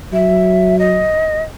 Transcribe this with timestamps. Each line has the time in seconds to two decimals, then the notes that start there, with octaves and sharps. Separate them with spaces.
0.13 F#3 E5
0.79 D#5